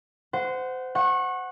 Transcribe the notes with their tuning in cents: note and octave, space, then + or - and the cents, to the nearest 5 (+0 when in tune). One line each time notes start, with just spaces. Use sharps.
C5 -25 F#5 +0
F#5 +0 C#6 -30